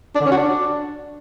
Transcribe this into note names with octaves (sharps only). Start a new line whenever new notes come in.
D4
D3
C#4
F#4
D4